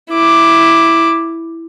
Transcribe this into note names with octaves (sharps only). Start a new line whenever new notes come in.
E4 D6